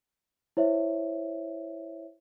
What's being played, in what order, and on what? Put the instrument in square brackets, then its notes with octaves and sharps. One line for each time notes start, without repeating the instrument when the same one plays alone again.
[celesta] E4 C5 C#5 E5